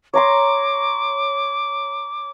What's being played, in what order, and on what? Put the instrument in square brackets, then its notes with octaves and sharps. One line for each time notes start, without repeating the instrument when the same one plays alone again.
[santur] C#5 A#5 C6 [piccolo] D6